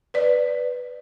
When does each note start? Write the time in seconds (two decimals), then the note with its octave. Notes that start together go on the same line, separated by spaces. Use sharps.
0.14 B4 D5